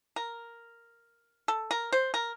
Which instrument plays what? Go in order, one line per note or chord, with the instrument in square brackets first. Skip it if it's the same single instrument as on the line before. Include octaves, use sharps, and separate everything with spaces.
[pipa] A#4
A4
A#4
C5
A#4